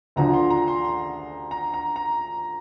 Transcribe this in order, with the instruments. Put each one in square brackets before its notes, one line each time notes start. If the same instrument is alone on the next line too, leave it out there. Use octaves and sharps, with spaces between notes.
[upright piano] D2 D3 F3 [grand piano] A#5
[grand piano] C6
A#5
C6
C6
A#5
A#5
A#5